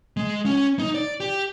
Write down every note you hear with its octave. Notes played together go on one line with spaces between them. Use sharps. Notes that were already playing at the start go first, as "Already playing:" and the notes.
G#3
C#4
D#4
D5
G4